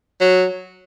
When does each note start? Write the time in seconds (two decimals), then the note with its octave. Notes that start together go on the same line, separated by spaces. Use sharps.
0.21 F#3